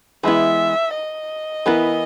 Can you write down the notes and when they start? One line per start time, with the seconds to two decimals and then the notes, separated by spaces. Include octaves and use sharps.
0.23 E3 G#3 B3 E4 E5
0.94 D#5
1.66 E3 B3 E4 A#4